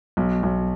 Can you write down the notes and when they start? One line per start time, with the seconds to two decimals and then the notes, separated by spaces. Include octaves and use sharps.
0.17 B1
0.43 B1